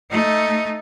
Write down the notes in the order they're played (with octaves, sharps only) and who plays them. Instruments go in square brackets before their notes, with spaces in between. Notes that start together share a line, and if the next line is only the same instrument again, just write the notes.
[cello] A3 D#4